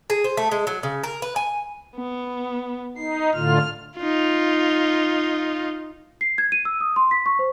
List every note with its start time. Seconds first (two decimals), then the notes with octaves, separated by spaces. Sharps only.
0.10 G#4
0.24 C5
0.37 A3
0.51 G#3
0.67 F#3
0.83 C#3
1.04 A#4
1.22 B4
1.36 G#5
1.95 B3
2.97 D#4 C7
3.35 A2 D3 F4 F6
3.98 D#4 F4
6.21 C7
6.38 G#6
6.52 D#7
6.65 E6
6.81 D#6
6.96 C6
7.11 B6
7.26 C#6
7.39 C5